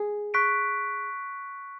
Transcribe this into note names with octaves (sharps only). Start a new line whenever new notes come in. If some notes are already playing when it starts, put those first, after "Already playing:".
Already playing: G#4
C#6 F#6 B6 D7